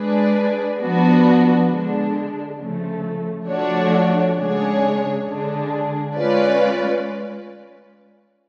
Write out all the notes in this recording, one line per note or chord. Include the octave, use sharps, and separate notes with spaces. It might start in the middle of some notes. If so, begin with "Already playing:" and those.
Already playing: G#3 D4 G#4 B4 D5
F3 B3 D4 F#4
D3 G#3 D4
C#3 F3 A3
F3 A3 D4 F#4 C#5
C#3 G#3 D4 G#4 C#5
D3 G#3 D4 G#4
G#3 C#4 F4 B4 D5